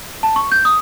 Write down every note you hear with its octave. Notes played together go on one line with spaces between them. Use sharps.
A5
C#6
G6
D#6